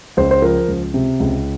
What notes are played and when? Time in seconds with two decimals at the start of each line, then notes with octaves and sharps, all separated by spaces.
0.17 C#2 C5
0.31 C5
0.42 F3 A#4
0.68 C#2
0.94 C3
1.20 C#2